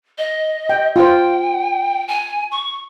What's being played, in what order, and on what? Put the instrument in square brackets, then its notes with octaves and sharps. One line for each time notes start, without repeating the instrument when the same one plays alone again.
[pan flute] D#5
[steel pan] G5
[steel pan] F4 C5 [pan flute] G5
[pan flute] G#5
C#6